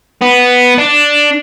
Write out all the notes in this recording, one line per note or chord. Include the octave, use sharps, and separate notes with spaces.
B3
D4